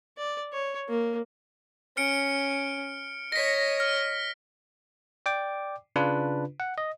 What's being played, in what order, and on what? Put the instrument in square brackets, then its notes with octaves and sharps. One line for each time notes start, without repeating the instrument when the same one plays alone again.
[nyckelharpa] D5
C#5
A#3
[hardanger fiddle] C#4 [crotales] F6 C#7 D7
[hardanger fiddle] C#5 D#5 [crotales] A#6 B6
[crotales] F6
[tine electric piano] D5 G5 D6
C#3 D4 F4 B4
F#5
D#5